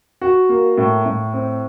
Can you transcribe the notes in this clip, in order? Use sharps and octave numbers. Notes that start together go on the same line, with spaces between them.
F#4
A#3
A2
A2
C4